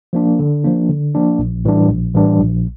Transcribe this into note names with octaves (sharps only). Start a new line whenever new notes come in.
F3 A#3 D4
D3
F3 A#3 D4
D3
F3 A#3 D4
A#1
A2 E3 G3 D4
A#1
A2 E3 G3 D4
A#1